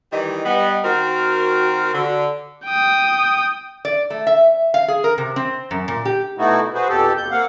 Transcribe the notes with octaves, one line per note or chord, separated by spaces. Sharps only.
D#3 E3 G3 D#5
G3 B3
D#3 C4 F#4 A#4
D3
G5 D#6
D5
A3
E5
F5
G#4
A#4
C3
C4
F#2
A#2
G4
B2 A3 B3 D#4 E4 F#4
F#4 G#4 B4 C5
F2 B2 G4 A4
D#2 G6
A#3 C4 F5 F#5